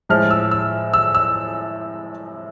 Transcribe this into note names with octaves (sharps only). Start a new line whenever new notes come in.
A2 F3 G#3 F6
E6
E6
E6
E6